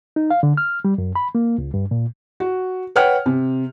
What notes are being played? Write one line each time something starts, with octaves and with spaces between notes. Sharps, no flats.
D#4
F5
D3
F6
G3
F#2
B5
A#3
C#2
G2
A#2
F#4
B4 C#5 F#5 G5 F6
C3